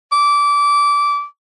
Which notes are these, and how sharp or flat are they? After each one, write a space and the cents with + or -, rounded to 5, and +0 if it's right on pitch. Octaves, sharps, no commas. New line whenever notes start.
D6 -20